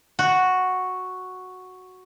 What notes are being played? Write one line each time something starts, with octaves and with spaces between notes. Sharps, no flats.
F#4